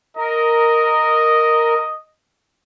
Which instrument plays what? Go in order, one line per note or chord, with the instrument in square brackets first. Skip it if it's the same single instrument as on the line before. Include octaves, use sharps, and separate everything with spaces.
[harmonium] A#4 [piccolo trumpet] D#5